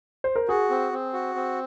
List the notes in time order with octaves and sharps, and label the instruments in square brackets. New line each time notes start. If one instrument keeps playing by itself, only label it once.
[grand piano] C5
A#4
[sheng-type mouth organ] F#4 [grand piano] G#4
[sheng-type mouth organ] C4
C4
F#4
C4